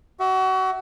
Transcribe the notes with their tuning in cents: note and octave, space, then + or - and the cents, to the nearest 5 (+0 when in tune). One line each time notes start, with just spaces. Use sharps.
F#4 +30 E5 -15